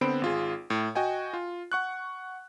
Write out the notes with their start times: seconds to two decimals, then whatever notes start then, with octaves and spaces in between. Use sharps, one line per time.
0.01 D3 B3 C4 C5 B5 D7
0.22 G#1 F4 G#4
0.70 A2
0.95 F#4 D#5 G5 G#5
1.33 F4
1.72 F#5 C#6 F#6